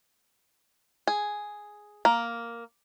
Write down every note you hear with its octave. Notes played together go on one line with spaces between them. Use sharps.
G#4
A#3